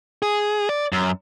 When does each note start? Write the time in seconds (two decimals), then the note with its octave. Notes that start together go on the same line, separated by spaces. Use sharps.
0.22 G#4
0.69 D5
0.92 F#2